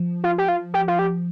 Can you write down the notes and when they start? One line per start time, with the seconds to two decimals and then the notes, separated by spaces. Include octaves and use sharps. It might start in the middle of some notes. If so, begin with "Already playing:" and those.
Already playing: F3
0.24 F4
0.38 G4
0.48 F4
0.74 G4
0.88 F4
0.99 G4